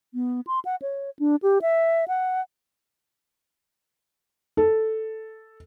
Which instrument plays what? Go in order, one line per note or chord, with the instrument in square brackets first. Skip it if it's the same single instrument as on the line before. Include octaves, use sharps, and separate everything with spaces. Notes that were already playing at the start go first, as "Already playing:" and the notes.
[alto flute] B3
C6
F#5
C#5
D4
G4
E5
F#5
[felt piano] A4